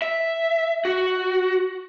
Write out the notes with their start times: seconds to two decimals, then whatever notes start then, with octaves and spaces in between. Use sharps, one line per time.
0.02 E5
0.85 F#4